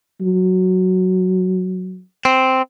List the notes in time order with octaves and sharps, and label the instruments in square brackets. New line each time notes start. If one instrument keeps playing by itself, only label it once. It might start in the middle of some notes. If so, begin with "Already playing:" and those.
[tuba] F#3
[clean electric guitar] C4